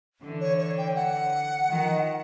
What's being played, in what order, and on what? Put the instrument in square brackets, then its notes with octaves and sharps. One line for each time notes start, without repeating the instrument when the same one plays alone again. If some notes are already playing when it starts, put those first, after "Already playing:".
[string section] D3 E3
[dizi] C#5
C#5
G5
F#5
[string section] D#3 F3